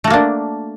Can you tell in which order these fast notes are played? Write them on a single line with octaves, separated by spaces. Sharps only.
A3 F#4 A#3 D4